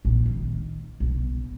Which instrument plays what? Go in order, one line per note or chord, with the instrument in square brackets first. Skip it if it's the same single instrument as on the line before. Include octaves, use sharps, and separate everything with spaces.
[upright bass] A#1
D#3
B1